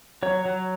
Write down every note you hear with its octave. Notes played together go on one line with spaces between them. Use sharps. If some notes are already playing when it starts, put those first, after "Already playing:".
F#3 C#5
F#3